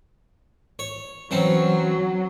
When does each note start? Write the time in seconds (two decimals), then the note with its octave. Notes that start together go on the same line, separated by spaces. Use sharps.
0.79 C#5
1.31 E3 F#3 C4 C#4